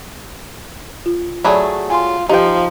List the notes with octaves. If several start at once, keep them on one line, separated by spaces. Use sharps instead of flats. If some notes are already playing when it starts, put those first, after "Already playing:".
F4
F#3 A3 G#4 D5 B5
F4 G#5 C6
F3 D#4 G4 G5